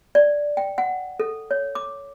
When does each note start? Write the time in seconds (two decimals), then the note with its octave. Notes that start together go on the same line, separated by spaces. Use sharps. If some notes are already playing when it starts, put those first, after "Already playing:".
0.15 D5
0.57 G5
0.78 F#5
1.20 A4
1.51 C#5
1.75 D6